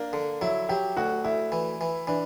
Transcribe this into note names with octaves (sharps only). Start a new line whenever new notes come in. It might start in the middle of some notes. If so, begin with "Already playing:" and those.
Already playing: A#3 D4
D3
F#3 E4
F#3 G4
D2 F#4
D2 E4
E3
E3
E3 D4